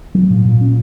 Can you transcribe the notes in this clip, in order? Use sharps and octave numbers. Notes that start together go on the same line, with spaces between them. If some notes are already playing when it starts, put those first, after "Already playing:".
F#3
A#2
A#2
C#4